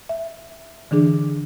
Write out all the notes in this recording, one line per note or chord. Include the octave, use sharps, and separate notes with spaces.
E5
D3 E3 D4 G#4